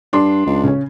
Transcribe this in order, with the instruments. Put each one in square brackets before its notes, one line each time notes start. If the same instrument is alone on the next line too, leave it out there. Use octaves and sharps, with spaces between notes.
[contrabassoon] G2 [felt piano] D4 C6
[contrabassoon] C#2
[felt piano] C#3 C#4